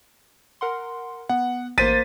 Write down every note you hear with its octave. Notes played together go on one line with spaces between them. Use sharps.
A#4 F#5 C6
B3 F#5
A1 A#3 C5 A6 B6 D#7